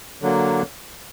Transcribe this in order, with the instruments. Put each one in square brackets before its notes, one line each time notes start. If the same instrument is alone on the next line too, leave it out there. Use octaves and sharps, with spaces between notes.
[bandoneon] D3 F#3 A#3